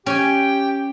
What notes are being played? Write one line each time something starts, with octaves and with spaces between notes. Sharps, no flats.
C#4 G4 G5 G#5